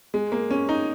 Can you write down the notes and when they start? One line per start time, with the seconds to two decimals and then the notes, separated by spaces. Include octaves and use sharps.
0.14 G#3
0.32 A#3
0.51 C#4
0.69 D#4